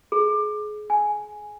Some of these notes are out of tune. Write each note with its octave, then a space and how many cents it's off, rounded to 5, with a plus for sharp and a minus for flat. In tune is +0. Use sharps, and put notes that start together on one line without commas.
G#4 +30
G#5 +0